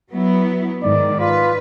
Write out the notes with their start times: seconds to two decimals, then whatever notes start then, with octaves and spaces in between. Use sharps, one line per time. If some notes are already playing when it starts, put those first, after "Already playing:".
0.10 F#3 B3 E4
0.83 G#2 D#3 D5
1.20 F4 B4